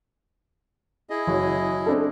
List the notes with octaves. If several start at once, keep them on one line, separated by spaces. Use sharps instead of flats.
E4 G#4 D#5
F#1 F#4 C#5
C4 D4 A4